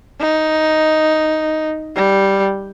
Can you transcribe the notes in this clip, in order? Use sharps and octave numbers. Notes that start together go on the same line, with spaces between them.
D#4
G3